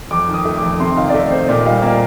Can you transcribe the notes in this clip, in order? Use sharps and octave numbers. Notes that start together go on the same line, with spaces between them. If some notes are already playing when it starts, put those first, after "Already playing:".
F2 D6
D#3
D#6
A3
D6
F2
C3 C6
D#3 F5
D5
A3 D#5
C3 C5
A#2 D5
G3 F5
A#3 F5